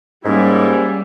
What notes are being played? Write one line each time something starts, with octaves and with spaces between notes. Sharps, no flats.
G#2 G3 A#3 C#4 E4